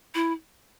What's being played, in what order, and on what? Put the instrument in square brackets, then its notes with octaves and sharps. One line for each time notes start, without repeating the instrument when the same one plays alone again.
[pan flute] E4